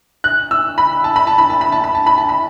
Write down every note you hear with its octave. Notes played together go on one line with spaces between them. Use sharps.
F#6
E6
B5
A5
B5
A5
B5
A5
B5
A5
B5
A5
B5
A5
B5